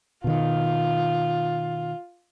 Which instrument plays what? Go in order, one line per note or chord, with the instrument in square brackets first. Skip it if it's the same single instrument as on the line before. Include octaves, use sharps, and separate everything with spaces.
[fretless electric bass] B2 D#3 [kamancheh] F4